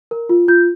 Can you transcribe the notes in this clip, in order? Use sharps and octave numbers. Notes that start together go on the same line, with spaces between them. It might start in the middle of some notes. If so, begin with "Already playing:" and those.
A#4
F4
F4 G6